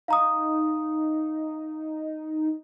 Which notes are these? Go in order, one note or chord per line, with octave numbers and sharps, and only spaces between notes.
D#4 F5 A#5 D#6